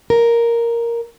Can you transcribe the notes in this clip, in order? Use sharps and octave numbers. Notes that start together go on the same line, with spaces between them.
A#4